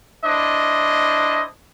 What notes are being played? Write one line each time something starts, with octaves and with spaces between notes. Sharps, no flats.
D4 E4 C5 D#5